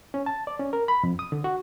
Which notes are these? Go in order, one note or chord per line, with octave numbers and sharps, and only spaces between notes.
C#4
A5
D5
C#4
A#4
B5
F2
D#6
D3
F#4